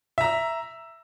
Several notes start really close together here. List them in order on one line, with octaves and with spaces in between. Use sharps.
E5 A#5 E6